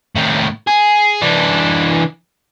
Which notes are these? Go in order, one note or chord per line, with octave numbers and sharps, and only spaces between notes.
A2 D#3
G#4
E3 D4